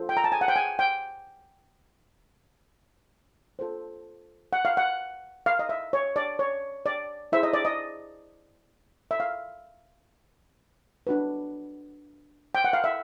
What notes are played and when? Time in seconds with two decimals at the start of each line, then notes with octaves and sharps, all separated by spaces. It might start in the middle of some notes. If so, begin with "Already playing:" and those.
Already playing: F4 A4 C5
0.09 G5
0.17 A#5
0.24 A5
0.32 G#5
0.41 F#5
0.48 G5
0.56 G#5
0.79 G5
3.59 F4 A4 C5
4.53 F#5
4.65 F5
4.77 F#5
5.46 F5
5.59 D#5
5.69 E5
5.93 C#5
6.16 D5
6.39 C#5
6.86 D5
7.32 E4 G#4 C5 E5
7.43 D#5
7.53 D5
7.65 D#5
9.11 E5
9.20 F5
11.07 D4 F#4 B4
12.55 G5
12.64 F#5
12.73 F5
12.84 E5